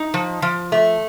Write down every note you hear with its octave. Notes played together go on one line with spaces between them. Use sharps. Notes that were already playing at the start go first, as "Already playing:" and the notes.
Already playing: D#4
F3
F3
A3